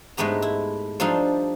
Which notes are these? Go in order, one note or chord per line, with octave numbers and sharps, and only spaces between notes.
G#2 G#3 A3 B3 G4 A#5
E4
F3 G3 D4 D#4 A4 C6